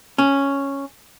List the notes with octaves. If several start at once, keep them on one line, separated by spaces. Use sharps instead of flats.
C#4